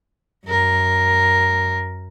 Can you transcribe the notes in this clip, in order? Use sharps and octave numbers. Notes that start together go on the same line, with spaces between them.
F#2 A#4